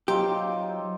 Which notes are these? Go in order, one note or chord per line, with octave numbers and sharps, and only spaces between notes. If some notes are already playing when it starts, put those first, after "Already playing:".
F#3 C4 D#4 F4 G4